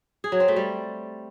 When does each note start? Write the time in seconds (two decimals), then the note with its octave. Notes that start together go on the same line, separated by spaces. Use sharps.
0.24 G#4
0.32 F#3
0.40 C4
0.48 A3
0.56 G3